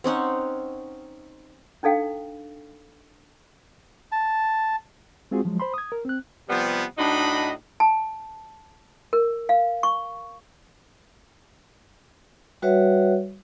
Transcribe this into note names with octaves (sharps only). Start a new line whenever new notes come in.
C4 C#4 D#4 F#5
D4 D#4 A4 F5 G5
A5
G#3 C4 F4 F#4 G#4
F3 F#3 G#3
C5 B5 C6
D#6 G#6
A#4
C4 F#6
C3 F3 G3 B3
A2 D4 D#4 F#4 D#5 B5
A5
A#4
F5
C#6
G3 F#4 B4 C#5 E5 F#5